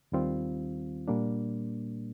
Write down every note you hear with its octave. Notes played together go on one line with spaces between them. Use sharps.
D#2 D#3 G3 C4 F4
A#2 G3 A#3 D4